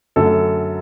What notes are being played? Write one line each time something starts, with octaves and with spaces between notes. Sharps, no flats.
F#2 D3 F#3 A3 A4